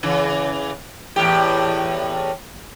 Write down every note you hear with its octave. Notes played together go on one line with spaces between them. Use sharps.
C#3 E3
E2 A2 G4